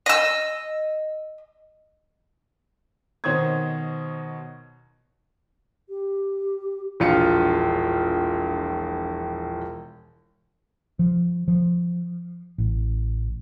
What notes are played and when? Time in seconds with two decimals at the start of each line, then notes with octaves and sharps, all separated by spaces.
0.06 D#5 E6
3.24 B2 D#3 C5 C#5 D#6 G#6
5.89 G4
7.00 E1 A#1 F4 F5 C#7 D#7
10.99 F3
11.48 F3
12.58 A1